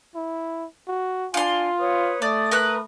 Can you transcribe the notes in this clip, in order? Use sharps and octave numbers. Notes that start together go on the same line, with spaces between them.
E4
F#4
D4 F4 F5 G#5 C6
B4 C#5 D#6
A3 D5 D#6
A#4 B4 F#6